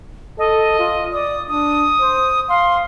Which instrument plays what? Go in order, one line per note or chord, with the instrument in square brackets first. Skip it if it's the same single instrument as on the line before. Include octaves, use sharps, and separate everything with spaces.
[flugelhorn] A4 [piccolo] D#5
[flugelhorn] F4
[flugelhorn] D5 [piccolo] D#6
[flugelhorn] D4 [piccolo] D#6
[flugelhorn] C5
[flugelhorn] F5 [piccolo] C6